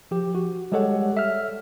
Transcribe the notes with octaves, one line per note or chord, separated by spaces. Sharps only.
F3 G4
F#4
G3 G#3 G4 A4 C#5 F#5
E5 F6